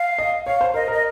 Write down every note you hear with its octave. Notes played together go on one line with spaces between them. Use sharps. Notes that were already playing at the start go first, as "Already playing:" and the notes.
Already playing: F5
D#5
C#5 F5
C5
A#4 D#5
A#4 D#5